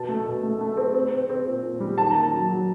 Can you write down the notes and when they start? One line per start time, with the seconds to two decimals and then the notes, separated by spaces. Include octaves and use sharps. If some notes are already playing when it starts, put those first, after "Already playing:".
Already playing: B2 A5
0.09 A3
0.25 B2
0.43 A3
0.61 A3
0.77 C4
0.94 C4
1.11 C4
1.29 C4
1.47 A#2
1.63 A#2
1.80 G3
1.97 D#3 A5
2.11 A#3 A#5
2.23 A5
2.33 F#3
2.49 F#3